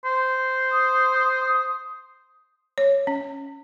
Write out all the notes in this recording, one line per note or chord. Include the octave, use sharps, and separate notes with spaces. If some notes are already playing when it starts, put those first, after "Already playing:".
C5
D#6
C#5
C#4